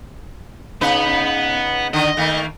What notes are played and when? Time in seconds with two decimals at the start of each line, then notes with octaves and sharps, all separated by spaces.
0.81 C#3 B3 D#4 B4 B5
1.93 D3 D#3 D#5
2.17 D#3 A3 A#3